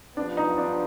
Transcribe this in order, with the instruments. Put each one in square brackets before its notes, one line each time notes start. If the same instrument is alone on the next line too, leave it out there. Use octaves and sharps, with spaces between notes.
[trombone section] B3 [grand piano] D4
[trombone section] G2 F3
[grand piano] D#4
D4